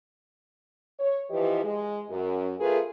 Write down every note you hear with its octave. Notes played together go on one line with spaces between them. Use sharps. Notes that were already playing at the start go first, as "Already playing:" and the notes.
C#5
E3 F3 G4 B4 D#5
G#3
F#2
A3 F4 G#4 A#4 B4